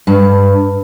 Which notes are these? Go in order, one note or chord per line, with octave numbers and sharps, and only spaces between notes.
G2